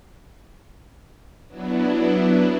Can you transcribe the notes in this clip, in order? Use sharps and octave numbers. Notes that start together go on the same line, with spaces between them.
F#3 B3 D4 E4